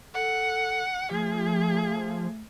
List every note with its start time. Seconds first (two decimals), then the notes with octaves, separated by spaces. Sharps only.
0.14 A4 F#5
1.11 F3 A3 G#4